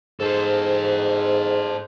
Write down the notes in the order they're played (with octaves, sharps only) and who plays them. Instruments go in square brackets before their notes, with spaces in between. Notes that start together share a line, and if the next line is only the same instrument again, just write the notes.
[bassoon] G#2 [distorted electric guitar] A4 C5